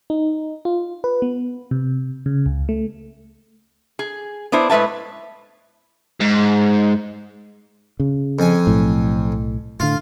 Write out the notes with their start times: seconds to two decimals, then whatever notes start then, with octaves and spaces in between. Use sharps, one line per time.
0.10 D#4
0.65 F4
1.04 B4
1.22 B3
1.71 C3
2.26 C#3
2.46 C#2
2.69 A3
3.99 G#4
4.52 B3 D4 E4 C5
4.70 A2 G#3 B4 E5 A5
6.20 G#2
8.00 C#3
8.39 F2 G#5
8.67 B1 A2
9.80 A2 D3 F4